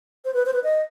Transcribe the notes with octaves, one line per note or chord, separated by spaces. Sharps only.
C5
B4
C5
B4
D#5